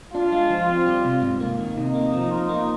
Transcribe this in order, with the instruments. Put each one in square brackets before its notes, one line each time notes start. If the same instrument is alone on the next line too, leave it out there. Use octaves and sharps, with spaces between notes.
[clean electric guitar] D4 [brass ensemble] F4
[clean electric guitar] G#3
F3
C4
G3
C3
G#2
A#3
D#3
[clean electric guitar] C3 [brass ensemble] D#4
[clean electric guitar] A#3
F3
F4
A#3